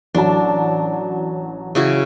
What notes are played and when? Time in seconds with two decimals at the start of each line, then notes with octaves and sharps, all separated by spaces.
0.15 A1 F#3 D4 A5
1.75 C#3 E4 F#4